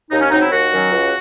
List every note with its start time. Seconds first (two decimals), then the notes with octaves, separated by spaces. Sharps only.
0.10 D#2 D#4
0.21 C#4
0.30 C#3 F#3 C4 D#4
0.40 E4
0.51 D#2 F#4
0.71 D#3 F#3 C#4
0.91 C#2